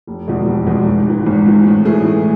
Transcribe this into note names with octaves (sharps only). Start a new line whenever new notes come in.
F1
E2 B2 G#3
F1
E2 B2 G#3
G#1
G#2 E3
G#1
G#2 E3
A2
E3 A3 E4 G#4
A2